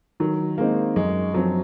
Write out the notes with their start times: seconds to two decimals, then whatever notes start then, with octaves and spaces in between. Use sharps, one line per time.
0.20 D#3 F#3
0.58 G#3 A#3 C4 D#4
0.96 F#2 G#3
1.34 F3 F#3 C4 F4